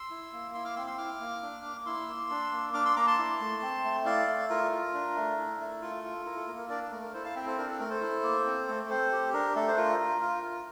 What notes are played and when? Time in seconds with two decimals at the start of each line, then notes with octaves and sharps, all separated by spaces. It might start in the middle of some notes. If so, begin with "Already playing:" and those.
Already playing: C6 E6
0.10 E4
0.33 A#3
0.54 E4 C6 E6
0.65 D6 F6
0.76 C4 C6 E6
0.87 C6 E6
0.97 E4 D6 F6
1.20 A#3
1.42 D4
1.64 A#3
1.86 E4 C6 E6
2.08 A#3
2.30 D4
2.51 A#3
2.73 D4 D6 F6
2.85 C6 E6
2.96 A#3 A#5 D6
3.07 A5 C6
3.19 E4
3.40 A3
3.62 C4
3.84 A3
4.05 E4 D5 F5
4.27 A3
4.50 F4 A#4
4.71 F4
4.94 D4
5.16 A3
5.37 E4
5.60 A3
5.81 F4 A4
6.04 F4
6.25 E4 A#4
6.36 A4
6.48 A#3 A#4
6.58 A#4
6.69 D4 A#4 D5
6.91 A3 A#4
7.02 A#4
7.13 E4 A4 C5
7.24 F5 A5
7.36 C4 E5 G5
7.46 A4 C5
7.58 D4 A#4
7.68 A4
7.79 A3 A#4
7.90 A4 C5
8.01 E4
8.23 A#3
8.45 C4
8.68 A3
8.89 C4 A4 C5
9.12 G4
9.33 D4 A#4
9.56 A3 A4
9.68 C5
9.77 F4 A#4
10.00 F4
10.21 F4
10.43 F4